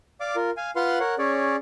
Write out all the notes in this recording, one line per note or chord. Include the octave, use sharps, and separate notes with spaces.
D5 F5 D6
F4 A#4
F5 G#5
F4 B4 F5 F#5 C6
A#4 C#5 F#5
C#4 G#4 C#5 D5